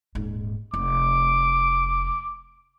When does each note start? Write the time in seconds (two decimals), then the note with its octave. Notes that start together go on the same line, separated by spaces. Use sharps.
0.15 D#1 G#2
0.74 F1 D6